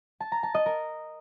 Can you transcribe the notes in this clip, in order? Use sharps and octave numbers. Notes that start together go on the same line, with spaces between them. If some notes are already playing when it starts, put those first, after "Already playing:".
A5
A#5
A5
D#5
A#4